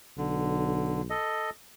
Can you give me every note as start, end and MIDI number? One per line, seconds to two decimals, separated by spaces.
0.18 1.15 35
0.18 1.02 50
1.10 1.50 69
1.10 1.50 75